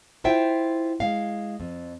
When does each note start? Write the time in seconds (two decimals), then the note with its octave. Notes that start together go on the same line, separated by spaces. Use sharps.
0.24 E4 F4 C5 E5 G5
1.00 G#3 F5
1.60 F2